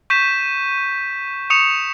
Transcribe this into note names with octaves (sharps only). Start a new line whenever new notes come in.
C#6 G6 B6 D#7 E7
C#6 D#6 C#7 E7 F7